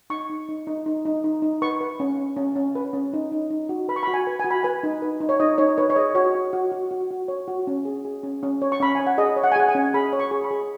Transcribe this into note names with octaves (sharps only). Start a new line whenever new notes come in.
D#4 C#6
D#4
D#4
D#4
D#4
D#4
D#4
D#4
B4 C#6
B4
C#4
C#4
C#4
C#4
B4
C#4
D#4
D#4
D#4
F#4
B4 B5
C#6
F#4 B5
G#5
B4
G#5
F#4
B5
B4 G#5
D#4
B4
D#4
C#5
D#4 D#5
D#4 C#5
B4 C#5
C#5
G#4 D#5
F#4 C#5
F#4
F#4
F#4
F#4
F#4
C#5
F#4
C#4
G#4
G#4
C#4
C#4
C#5
C#6
C#4 B5
C#5 G#5
F#5
G#4 D#5
C#5
F#5
G#5
G#4 F#5
G#5
C#4
G#4 B5
C#5
C#6
G#4
B5
G#4